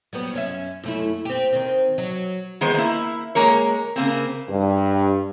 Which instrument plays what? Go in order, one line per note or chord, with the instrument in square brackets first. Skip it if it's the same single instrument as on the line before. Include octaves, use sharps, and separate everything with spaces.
[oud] F#3 G3 B3
F#2 C#4 E5
F#2 A3 E4
C4 G4
D#3 C4
F#3
[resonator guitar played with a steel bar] D#3 G#3 B3 C5
A#3 E4
G#3 A#3 A#4 C#5
C#3 A#3 C4
[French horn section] G2